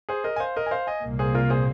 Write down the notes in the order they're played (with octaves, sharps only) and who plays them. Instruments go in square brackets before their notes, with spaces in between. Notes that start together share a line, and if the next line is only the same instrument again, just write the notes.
[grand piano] G#4 C5
A#4 D#5
G#5
C5 F5
A#4 D#5
G#5
C5 F5
D#5 G#5
[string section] C2 A#2 A#3
[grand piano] G#4 C5
F4 A#4
G#4 C5